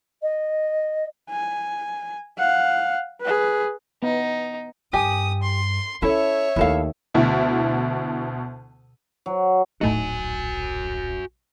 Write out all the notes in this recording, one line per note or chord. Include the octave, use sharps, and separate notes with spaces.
D#5
G#5
F5 F#5
G#4 B4
B3 D#4
G2 G4 G#5 D#6
C6
C#4 E4 A4 C#5 E5
D#2 A3 E4 A4 F5
D2 B2 E4
F#3
D1 A#1 A2 A3 D#4 F#4 G#5